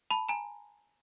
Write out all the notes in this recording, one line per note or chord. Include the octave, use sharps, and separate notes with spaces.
A5 B5
G#5 A#5